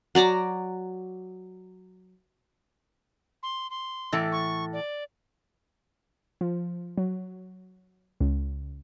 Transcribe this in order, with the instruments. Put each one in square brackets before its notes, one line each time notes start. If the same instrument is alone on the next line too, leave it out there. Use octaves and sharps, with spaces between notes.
[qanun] F#3 D5 A#5 D6
[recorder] C6
C6
[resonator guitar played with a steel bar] A2 E3 A4
[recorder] C#6
D5
[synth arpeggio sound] F3
F#3
C#2